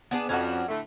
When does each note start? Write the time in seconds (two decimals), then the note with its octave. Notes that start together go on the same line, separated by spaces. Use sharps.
0.11 B3 D4 G#4
0.29 F2 C#4 D4 F#4
0.68 A2 D3 A3